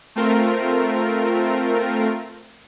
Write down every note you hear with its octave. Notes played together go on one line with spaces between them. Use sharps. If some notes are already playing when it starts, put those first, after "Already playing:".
A3 C4 F4 A#4